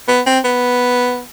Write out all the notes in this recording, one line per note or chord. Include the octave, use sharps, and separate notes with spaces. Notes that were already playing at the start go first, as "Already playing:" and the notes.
B3
C4
B3